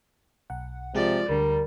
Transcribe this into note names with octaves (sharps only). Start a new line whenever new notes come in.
B1 F#5
C3 F3 G#3 G#4 D5
D2 D3 G3 A#4